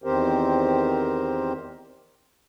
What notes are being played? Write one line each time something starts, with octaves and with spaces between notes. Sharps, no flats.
E2 D#3 C4 G4 A#4 C5